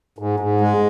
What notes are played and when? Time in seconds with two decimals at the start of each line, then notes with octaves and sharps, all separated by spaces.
0.18 G#2
0.40 G#2
0.61 G#3